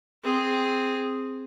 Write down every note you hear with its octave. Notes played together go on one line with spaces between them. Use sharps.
C4 G#4